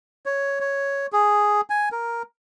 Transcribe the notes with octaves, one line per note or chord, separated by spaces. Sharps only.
C#5
C#5
G#4
G#5
A#4